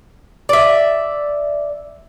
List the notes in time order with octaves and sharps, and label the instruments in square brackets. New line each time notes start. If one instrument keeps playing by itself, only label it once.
[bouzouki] D5 E5